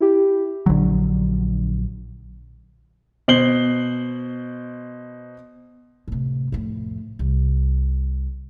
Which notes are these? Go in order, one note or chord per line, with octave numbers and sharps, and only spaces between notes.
E4 G4
A#1 D3 F#3
B2 C5 C7 F#7 G7
A2 C3
F2 A2
C2